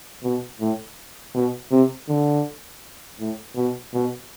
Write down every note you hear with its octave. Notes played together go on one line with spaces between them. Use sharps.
B2
A2
B2
C3
D3
A2
B2
B2